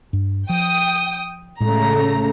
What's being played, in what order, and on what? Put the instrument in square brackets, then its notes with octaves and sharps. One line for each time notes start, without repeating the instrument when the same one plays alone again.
[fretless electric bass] G2
[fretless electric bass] F3 [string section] G5 D#6
[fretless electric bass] A2 G#3 [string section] C#3 A3 A#5